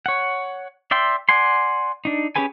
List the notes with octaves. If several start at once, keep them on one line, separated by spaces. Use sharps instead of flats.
C#5 F#5
D5 E5 G5 C6
D5 F#5 G#5 C6
D4 D#4
C#4 G4 G#4 B4 G#5